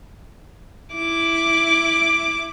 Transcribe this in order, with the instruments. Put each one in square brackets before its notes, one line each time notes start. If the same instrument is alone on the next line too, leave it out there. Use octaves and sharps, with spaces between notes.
[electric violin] E4 D6